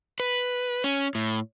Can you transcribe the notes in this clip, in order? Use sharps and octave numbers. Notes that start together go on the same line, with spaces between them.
B4
C#4
A2